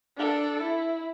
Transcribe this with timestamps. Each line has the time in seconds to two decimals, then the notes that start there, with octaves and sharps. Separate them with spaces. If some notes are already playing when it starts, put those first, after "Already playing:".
0.17 D4 A4
0.62 E4